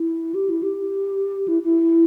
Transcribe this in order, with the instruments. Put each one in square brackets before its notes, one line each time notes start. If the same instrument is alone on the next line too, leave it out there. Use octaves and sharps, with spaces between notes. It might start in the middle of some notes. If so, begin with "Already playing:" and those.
Already playing: [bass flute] E4
G4
E4
G4
E4
E4